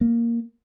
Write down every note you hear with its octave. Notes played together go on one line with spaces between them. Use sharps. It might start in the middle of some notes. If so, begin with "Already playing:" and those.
A#3